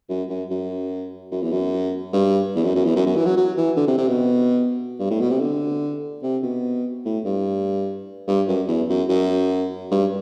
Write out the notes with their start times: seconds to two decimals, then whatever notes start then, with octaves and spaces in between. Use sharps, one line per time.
0.09 F#2
0.30 F#2
0.50 F#2
1.31 F#2
1.42 E2
1.52 F#2
2.13 G2
2.55 E2
2.64 F#2
2.75 F#2
2.85 E2
2.96 F#2
3.06 F#2
3.16 E3
3.26 F#3
3.37 F#3
3.57 E3
3.77 D3
3.87 C3
3.98 C3
4.08 B2
5.00 G2
5.10 A2
5.20 B2
5.31 C3
5.40 D3
6.23 C3
6.43 B2
7.05 A2
7.25 G2
8.28 G2
8.48 F#2
8.68 E2
8.89 F#2
9.09 F#2
9.91 G2